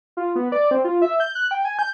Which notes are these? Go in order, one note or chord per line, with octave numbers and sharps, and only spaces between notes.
F4
B3
D5
C4
F4
E5
G6
F#6
G5
G#5
G6